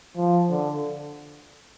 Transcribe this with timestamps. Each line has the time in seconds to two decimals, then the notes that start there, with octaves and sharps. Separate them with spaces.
0.17 F3
0.50 D3